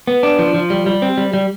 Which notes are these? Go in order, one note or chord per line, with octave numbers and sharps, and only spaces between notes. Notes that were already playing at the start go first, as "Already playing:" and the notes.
B3
D4
F3
F3
G3
G3
C4
G3
G3